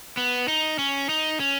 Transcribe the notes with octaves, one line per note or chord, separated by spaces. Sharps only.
B3
D#4
C#4
D#4
C#4